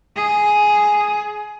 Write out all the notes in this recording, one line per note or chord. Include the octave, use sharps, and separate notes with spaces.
G#4